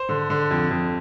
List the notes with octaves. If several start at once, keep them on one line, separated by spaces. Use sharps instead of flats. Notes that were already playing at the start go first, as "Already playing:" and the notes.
Already playing: C5
D3
D3
F2
F2